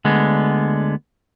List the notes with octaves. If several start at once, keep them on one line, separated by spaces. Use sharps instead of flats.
D2 D3 G#3 B3